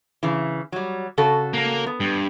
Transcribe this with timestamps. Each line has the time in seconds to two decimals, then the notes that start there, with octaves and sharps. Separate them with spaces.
0.23 C#3 E3
0.72 F#3 G3
1.18 C#3 F#4 A4
1.53 A#3 A#4
1.86 B3
2.00 G2